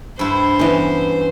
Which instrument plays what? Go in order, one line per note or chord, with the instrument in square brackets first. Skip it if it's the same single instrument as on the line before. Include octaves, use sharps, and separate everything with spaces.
[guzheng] G2 E4 [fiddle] C5
[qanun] E3 B3 [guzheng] C#4